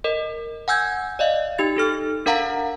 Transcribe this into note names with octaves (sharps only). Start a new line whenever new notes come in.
A#4 D#5
F#5 G#5 E6 G6 G#6
D5 D#5 F5
D#4 G4 A6
D#4 A4 F6
D4 A#4 F5 F#5 A#5